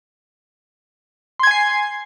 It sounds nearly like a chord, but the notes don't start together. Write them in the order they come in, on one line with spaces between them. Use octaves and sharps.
C6 G#6 G#5 C7